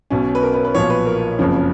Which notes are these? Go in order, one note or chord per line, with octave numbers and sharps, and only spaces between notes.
B1 B2 C#4
B4
A#4
B4
B4
B1 A#2 F3 C#5
B4
A#4
F#1 F2 C#3 F3